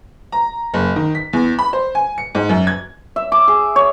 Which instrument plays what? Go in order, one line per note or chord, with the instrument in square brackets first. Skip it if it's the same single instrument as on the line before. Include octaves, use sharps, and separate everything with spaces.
[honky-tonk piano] A#5
F#1
D#3
B6
E2
B5
C5
G#5
C#7
G#2
F#2
G#6
[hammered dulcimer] E5
D6
G#4
C#5